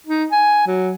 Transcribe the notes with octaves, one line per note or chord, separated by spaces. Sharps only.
D#4
G#5
F#3